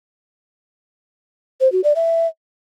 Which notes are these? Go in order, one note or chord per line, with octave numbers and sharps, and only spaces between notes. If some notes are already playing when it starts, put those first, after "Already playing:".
C5
F#4
D5
E5